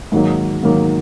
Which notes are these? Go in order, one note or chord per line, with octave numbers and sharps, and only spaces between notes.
G#2 D#3 F#3 A#3
G#2 D#3 F#3 A#3